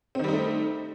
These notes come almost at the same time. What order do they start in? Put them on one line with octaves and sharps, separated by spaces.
C4 D#3 G3 D#4 A3